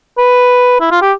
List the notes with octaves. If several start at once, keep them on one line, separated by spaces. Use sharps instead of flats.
B4
E4
F4
G4